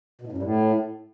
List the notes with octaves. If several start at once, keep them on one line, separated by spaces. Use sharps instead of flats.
B2
A2
F#2
G2
A2